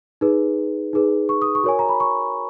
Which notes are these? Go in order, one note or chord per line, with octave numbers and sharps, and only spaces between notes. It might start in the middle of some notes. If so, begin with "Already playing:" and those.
D#4 G#4 B4
D#4 G#4 B4
C#6
D#6
C#6
F#4 A#4 C#5 G#5
A#5
B5
C#6